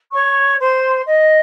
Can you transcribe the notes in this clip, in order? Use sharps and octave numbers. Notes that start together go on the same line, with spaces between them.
C#5 C#6
C5 C6
D#5